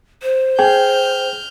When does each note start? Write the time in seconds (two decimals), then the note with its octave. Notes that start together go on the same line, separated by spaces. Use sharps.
0.22 C5
0.59 G#4 G5 F6 G6